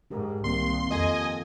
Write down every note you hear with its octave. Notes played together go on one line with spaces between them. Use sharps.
G#2 D4 G4 A#4
C2 D#3 A#3 C4 C6
F2 F4 A4 D#5 G#5